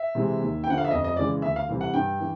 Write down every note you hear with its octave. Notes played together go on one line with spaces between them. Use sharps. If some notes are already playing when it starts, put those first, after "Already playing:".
Already playing: E5
C3 E3 G#3
D#2
G5
D3 F3 F#5
F5
E5
F2 D#5
D#5
C#3 E3 G#3 D5
D2 E5
F5
C3 E3 G3
F#5
G2 G5
E3